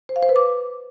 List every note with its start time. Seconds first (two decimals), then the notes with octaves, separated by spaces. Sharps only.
0.09 C5
0.16 F5
0.22 C5
0.29 B4
0.36 D6